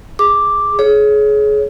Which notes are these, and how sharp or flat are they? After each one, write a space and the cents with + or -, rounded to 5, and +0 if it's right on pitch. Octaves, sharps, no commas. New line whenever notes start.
G#4 +0 D6 +0
G#4 +25 C#5 +5